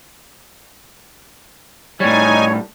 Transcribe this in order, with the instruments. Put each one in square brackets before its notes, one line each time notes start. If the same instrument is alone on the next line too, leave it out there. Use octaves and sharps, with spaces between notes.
[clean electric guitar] A2 G3 [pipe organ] D#4 G#5 [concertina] C#5